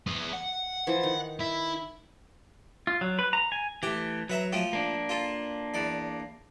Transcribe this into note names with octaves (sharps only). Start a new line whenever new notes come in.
B3 G#4
F#5
E3 F3 E4
D#3
E4
F4
F#3
B4
A#5
G#5
E3 A3 G4
F#3 B4 E5 A#5
F3 A3 G5
A#3 D4
F4 A4
E2 D5